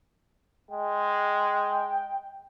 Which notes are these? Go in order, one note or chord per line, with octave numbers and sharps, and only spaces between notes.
G#3 G5